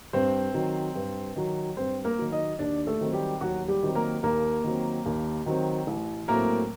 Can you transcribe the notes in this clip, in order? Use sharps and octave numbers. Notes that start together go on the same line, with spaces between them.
G2 C4 C5
D#3 F#3
G2
D#3 F#3
G2 C4 C5
A#3 A#4
D#3 F#3
D#4 D#5
D#2 D4 D5
A3 A4
D#3 F#3 C4
G3 G4
D#2 F#3 F#4
G3 G4
D#3 F#3 C4
A#3 A#4
D#2 A#3 A#4
D#3 F#3 C4
D#2
D#3 F#3 C4
A1
A2 F#3 A3 A#3 C4 A#4